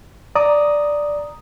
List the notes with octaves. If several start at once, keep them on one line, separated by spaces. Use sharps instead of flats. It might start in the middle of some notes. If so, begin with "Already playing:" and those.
D5 A#5 D#6